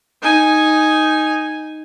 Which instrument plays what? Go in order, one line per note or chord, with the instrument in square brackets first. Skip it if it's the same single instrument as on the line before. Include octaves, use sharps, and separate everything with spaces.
[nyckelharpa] D#4 G#5